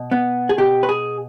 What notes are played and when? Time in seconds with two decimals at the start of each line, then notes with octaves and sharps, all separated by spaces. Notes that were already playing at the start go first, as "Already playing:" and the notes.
Already playing: B2
0.11 B3
0.49 G#4
0.58 B2 G4
0.83 B4
0.89 G#4